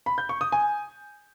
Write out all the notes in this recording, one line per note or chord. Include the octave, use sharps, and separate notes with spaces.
B5
G6
C#6
D#6
G#5